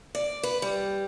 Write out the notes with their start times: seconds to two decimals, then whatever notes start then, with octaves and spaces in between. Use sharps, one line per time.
0.15 D5
0.43 B4
0.62 G3